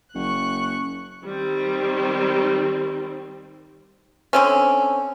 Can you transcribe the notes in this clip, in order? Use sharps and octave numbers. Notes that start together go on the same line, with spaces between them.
F#1 C#6 F#6
D#3 G3 C4
D3 C4 C#4